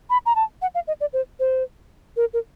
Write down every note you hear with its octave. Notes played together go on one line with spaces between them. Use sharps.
B5
A#5
A5
F#5
F5
D#5
D5
C5
C5
A#4
A#4